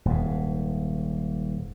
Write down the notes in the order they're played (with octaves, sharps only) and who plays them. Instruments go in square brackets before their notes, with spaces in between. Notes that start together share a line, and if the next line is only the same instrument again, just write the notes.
[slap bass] D#1 G#2